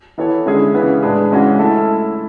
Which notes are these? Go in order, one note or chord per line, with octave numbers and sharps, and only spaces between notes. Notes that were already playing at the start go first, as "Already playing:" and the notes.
E3 B3 E4 A4 C#5
D3 G#3 C#4 E4 G#4
C#3 E3 B3
A2 G#3 D4 G#4 B4
C#3 E3 G#3 C#4 F#4
A3 E4 A4